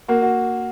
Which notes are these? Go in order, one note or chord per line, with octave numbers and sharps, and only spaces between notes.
A#3 F#4
F#4